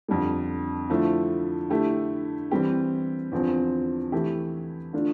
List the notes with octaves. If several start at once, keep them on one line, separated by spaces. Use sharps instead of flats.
F2 D3 G3
D3 F3 A3 E4
D3 A3 E4 G4
E3 G3 C4 G4
E2 D3 F3 C4
E3 A3 E4 G4
D3 A3 D4 F4